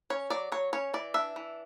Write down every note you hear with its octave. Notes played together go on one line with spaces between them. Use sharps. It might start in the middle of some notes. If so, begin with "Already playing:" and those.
C#4 C#5
F#3 D5
F#3 C#5
C#4 C#5
E3 D5
D4 E5
E3